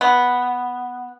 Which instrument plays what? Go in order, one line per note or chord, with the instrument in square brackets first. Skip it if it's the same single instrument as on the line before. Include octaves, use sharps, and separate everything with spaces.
[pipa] B3